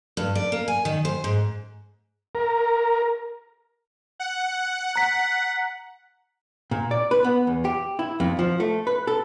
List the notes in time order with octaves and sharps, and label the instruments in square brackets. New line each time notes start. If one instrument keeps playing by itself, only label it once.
[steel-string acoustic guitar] G2
D5
A#3
G#5
D#3
C5
G#2
[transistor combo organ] A#4
[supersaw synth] F#5
[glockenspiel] A#5 B6
[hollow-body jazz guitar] A#2
D5
B4
B3
E2
G4
E4
F2
F3
A3
B4
A4